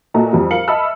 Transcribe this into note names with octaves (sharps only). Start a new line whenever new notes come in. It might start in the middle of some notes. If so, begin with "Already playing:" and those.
A#2 F#4 A4 D#5 E5 A#5
F2 G3
A#4 F5 C#7 F#7
D#5 E5 A5 B5 E6 F6